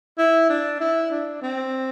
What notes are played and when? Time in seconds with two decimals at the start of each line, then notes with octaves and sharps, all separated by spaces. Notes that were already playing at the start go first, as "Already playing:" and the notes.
0.18 E4
0.49 D4
0.80 E4
1.11 D4
1.42 C4